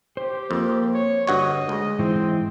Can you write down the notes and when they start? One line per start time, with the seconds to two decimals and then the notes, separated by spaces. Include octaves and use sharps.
0.17 G4 C5
0.51 F2 A#3
0.94 C#5
1.27 G2 D3 F#4 C#5 D#5
1.69 D2 G#3
1.99 G#2 E3 C4 E4